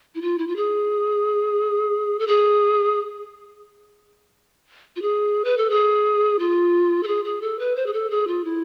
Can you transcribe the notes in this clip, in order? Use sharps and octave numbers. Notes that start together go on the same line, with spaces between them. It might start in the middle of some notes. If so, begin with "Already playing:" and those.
E4
F4
E4
F4
G#4
A4
G#4
F4
G#4
B4
A4
G#4
F4
A4
G#4
G#4
A4
B4
C5
G#4
A4
G#4
F4
E4